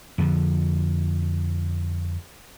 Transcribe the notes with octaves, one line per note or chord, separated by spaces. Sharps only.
F2 D3 F3